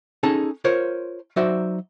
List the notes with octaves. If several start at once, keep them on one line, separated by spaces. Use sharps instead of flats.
C#4 D#4 G#4 A4 A5
F4 A#4 C5 C#5
F#3 D#4 F#4 C5 D5 E5